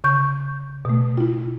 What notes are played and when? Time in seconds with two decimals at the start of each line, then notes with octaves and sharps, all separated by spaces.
0.04 C#3 C#6 G6
0.85 B2 A3
1.17 E4 F4